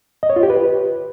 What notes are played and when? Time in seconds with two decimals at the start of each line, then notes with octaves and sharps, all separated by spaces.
0.23 D#5
0.30 C#5
0.36 F4
0.43 G4
0.50 B4